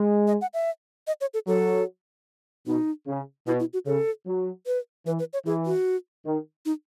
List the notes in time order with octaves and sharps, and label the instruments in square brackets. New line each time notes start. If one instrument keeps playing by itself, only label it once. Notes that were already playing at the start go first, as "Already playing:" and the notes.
Already playing: [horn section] G#3
[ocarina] D#5
F#5
E5
D#5
C#5
A4
[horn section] F#3 [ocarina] A4
[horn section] B2 [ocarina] D#4
[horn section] C#3
[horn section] B2 [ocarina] E4
[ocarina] E4
F#4
[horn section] C#3 [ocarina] A4
[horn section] F#3
[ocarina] B4
[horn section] E3 [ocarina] B4
[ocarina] B4
C#5
[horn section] E3 [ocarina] G#4
[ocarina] F#4
[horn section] D#3
[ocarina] D#4